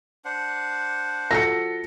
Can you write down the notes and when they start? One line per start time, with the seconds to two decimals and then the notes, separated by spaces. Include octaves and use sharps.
0.25 D4 C5 F#5
1.31 F3 F#4 A4 A#6 C#7